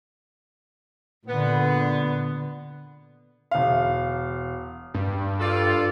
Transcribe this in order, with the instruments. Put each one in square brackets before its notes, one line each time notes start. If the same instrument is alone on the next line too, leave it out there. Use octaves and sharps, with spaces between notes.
[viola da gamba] A#2 D3 [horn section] B3
[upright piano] E1 F5
[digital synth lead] G2
[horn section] F4 A4 D5